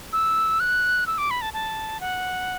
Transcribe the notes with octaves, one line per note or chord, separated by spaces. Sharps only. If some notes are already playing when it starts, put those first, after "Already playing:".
E6
F#6
E6
D6
B5
A5
A5
F#5